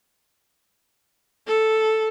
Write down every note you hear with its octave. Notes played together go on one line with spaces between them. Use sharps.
A4